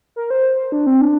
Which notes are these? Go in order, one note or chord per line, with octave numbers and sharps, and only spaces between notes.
A#4
C5
D4
C4
D4